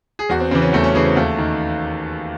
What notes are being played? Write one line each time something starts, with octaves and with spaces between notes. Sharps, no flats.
G#4
E2 F#4
C4
C#3 E3 C4
C#4
E2 A3
C#4
C#3 E3 G#4
C4
D#2 A3
D#3